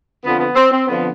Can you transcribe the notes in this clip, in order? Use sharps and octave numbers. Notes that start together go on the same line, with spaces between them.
F2 D3 F3 B3
B3
C4
C4
F2 D3 F3 B3